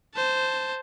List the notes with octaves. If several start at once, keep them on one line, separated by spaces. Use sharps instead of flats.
C5 A5